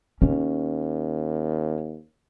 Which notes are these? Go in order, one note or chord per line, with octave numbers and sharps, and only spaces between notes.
D#2 C#4